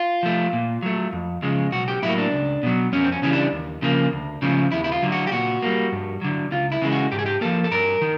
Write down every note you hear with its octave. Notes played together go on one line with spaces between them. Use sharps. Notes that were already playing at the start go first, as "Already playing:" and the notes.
Already playing: F4
F3 A3
A#2
F#3 A3
F2
C#3 F3 G#3
B1 F#4
G4
A2 F#3 A#3 E4
D4
C#2
B2 F#3
F2 C#4
C4
C#4
C#3 E3 G3 C#4
D4
D#2
C#3 F3 A#3
D2
C#3 F3 A3
D#2 E4
E4
F4
D3 F#3
F#4
G4
A#2 F#4
G3 A#3
G2
D3 F#3
C#2 F4
E4
C#3 E3 G#3
F#4
G#2 G4
G#4
G4
F3 A#3 A4
A4
G2 A#4
D#3